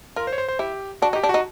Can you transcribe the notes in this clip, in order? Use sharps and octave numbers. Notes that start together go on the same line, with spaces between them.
F4 A#4
C5
C#5
C5
C5
E4 G4
D4 F#4
D#4
G4
D4
D#4 F#4